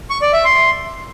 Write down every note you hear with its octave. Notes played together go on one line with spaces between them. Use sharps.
C#6
D5
E5
C6